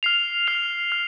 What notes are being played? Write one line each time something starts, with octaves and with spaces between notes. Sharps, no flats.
F6 C7 F7
F6 C7 F7
F6